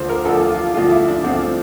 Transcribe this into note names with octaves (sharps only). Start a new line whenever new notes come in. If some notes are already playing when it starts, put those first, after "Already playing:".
Already playing: D2 D3 F3 C5
A#4
D2 D3 F3 A4
F4
D2 D3 F3 F4
E4
D4
D2 D3 F3 C4